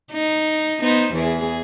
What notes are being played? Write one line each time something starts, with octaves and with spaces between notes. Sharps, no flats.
D#4
B3 D#4 C5
E2 E3 G#4